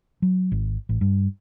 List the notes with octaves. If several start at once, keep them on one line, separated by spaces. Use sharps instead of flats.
F#3
G#1
A1
G2